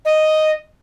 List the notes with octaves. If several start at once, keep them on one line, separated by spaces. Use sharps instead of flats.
D#5